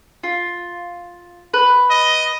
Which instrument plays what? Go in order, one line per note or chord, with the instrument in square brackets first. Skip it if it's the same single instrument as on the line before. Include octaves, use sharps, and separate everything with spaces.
[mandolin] F4
B4
[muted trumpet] D#5